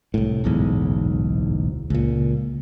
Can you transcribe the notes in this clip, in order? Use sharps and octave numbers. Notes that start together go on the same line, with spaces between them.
C2 A2
D1 B1 E2 G#2
C#2 A#2